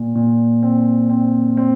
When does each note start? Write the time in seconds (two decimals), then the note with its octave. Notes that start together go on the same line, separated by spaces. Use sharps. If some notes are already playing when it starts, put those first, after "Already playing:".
Already playing: A#2
0.15 A#2
0.63 C4
1.10 C4
1.57 C4